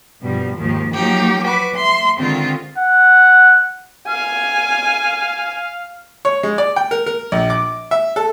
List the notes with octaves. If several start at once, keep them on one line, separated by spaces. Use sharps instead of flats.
G2 B2 F3 G3
D#2 G#2 D#3 F3
F3 F#3 A3 A#3 D#4 G4
F#4 B4 B5 D6
E5 C6
D3 D#3 G#3 C4 F4
F#5
F5 G#5
C#5
G#3
D5
G5
A#4
A#4
A#1
D6
E5
A4